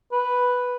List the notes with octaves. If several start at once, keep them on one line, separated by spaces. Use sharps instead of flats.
B4